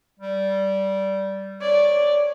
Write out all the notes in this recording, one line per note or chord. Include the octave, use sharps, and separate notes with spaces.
G3
C#5 D5